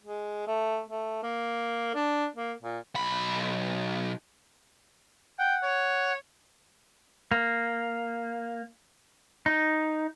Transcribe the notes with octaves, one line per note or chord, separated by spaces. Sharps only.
G#3
A3
A3
A#3
D4
A#3
A#2
B1 B5
F#5 G5
C#5
A#3
D#4